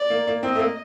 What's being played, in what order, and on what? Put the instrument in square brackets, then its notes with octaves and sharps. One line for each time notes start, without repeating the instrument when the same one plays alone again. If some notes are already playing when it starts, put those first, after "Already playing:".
Already playing: [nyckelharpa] D5
[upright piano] A#3
A#3
[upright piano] C4 [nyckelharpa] D#5
[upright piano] A3
A#3